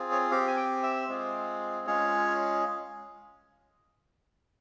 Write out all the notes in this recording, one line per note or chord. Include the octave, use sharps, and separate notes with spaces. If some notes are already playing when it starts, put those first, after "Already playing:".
Already playing: C4 F4 G#4
C#5
C4 G4 F5
G#5
G5
E5
G#3 C4 F4 G#4
G#3 C#4 F4 G#4 C#5